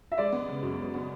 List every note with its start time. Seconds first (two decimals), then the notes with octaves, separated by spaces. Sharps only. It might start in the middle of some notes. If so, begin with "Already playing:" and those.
0.12 E5
0.18 G#3 D5
0.32 B3
0.48 C#3
0.63 F#2
0.79 G#3
0.94 B3